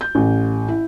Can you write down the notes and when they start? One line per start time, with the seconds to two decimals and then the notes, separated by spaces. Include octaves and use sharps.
0.01 G6
0.15 A1
0.68 E4